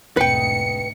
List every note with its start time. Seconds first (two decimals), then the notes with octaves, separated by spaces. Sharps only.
0.17 E1 D2 G#2 C4 B4 G5 C#7